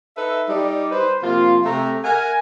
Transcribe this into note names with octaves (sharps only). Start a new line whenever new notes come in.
D#4 A4 B4 E5
G3 D#4 D5
B4 C5
C3 F3 A#3 F4
C3 A3 A#5
A#4 E5 F#5 G#5